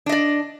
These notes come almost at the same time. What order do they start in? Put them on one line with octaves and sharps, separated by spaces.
D4 D#5 D5